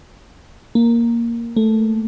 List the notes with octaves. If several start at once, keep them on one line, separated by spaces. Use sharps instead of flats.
A#3
A3